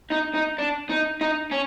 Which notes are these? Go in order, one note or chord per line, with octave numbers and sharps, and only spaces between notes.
D#4
D#4
D4
D#4
D#4
C#4